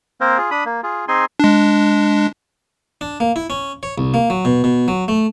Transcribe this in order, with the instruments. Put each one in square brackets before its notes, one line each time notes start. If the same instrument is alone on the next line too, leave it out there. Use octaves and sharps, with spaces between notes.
[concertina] A#3 C4 A#4 C5
F4 G#4
D4 B5 D#6
A#3
F4 G#4
C4 D#4 G#4 G#5 C6
[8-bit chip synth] G#3 D4
[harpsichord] D4
A#3
E4
C#4
C#5
C2
A#3
F#3
B2
B2
F#3
A3